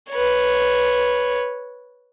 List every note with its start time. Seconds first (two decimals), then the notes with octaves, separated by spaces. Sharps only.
0.11 B4 C#5